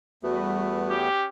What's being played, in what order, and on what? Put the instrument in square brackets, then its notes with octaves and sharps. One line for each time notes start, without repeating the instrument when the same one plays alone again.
[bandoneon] E2 A3 B3 [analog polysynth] G3 F#4 B4
[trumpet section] C#4 G4